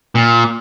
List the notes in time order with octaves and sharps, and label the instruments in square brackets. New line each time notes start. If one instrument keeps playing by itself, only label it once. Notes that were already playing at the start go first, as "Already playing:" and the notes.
[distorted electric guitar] A#2